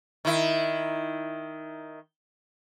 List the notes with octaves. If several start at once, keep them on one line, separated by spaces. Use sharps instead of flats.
D#3 E4